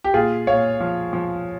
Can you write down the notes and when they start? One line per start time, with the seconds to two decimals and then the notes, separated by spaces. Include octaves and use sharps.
0.04 G4
0.14 A#2 F4 G#4
0.47 A#2 C#5 F5
0.80 F3
1.13 F3